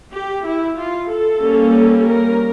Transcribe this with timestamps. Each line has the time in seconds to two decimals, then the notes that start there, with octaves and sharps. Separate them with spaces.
0.12 G4
0.44 E4
0.77 F4
1.10 A4
1.41 G3 A#3 C#4
2.06 A#4